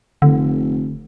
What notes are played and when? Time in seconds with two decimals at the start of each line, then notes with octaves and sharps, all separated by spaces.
0.22 F1 D3